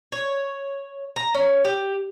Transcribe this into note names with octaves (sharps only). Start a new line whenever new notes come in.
C#5
A#5
C#4
G4